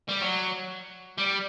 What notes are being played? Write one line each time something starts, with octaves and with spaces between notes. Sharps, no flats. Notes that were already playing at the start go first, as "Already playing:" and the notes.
G3
F#3
G3